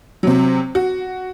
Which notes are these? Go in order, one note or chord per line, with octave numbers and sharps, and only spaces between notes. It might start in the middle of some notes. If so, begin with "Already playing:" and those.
C3 F#3
F#4